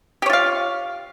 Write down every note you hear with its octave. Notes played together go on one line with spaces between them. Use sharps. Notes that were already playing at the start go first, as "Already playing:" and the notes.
F4 G4 C#5 F5